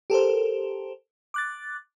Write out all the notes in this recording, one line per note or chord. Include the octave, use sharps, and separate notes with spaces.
G4 A4 A#4 C5
D6 F#6 A6